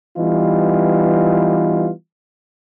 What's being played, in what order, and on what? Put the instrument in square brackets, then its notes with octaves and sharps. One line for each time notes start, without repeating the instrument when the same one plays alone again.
[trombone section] E3 G3 B3 D#4 F4